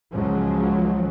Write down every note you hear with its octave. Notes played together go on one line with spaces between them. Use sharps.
C#2 C#3 F3 F#3 G#3